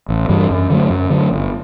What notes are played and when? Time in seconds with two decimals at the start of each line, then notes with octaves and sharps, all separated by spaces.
0.09 A1
0.29 G2 E3 G3
0.50 F#2
0.70 D3 F#3 A3
0.90 F#2
1.10 D3 F#3 A3
1.32 G1